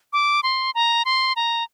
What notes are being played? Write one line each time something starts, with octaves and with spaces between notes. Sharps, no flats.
D6
C6
A#5
C6
A#5